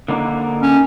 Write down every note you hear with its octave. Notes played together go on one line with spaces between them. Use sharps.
D3 A#3 D#4
C#4